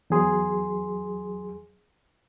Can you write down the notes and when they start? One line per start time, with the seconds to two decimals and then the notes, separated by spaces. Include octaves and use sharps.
0.10 E2 F#3 G#4 C6